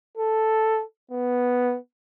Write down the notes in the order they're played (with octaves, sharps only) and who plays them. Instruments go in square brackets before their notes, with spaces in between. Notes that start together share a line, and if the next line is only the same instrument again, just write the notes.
[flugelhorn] A4
B3